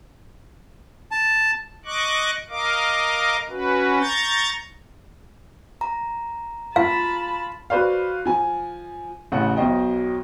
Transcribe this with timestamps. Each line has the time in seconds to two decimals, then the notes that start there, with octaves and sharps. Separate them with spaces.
1.11 A5
1.86 D#5 C#6 D6 F#6
2.50 A#4 D#5 F5 D6
3.49 C#4 F#4 B4
4.00 A#5 C#6 G6 A6
5.81 A#5
6.76 F4 F5 A5 B5
7.70 F#4 B4 C5 D5 F5
8.26 F3 G#5
9.32 A1 C#3 F#5
9.57 B1 B2 C5 D#5 G5